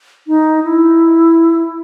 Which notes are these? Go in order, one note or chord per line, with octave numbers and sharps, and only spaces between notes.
D#4
E4